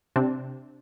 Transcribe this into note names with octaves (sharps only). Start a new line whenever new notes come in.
C3 C4 D4